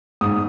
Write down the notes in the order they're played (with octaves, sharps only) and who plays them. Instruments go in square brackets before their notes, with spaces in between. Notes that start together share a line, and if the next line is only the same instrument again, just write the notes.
[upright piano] G#2 D#6